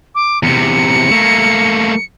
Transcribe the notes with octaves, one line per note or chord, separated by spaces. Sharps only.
D6
E2 C3 C#7
A3 A#3